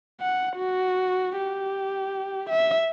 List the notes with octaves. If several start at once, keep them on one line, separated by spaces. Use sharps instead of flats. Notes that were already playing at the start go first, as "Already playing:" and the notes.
F#5
F#4
G4
E5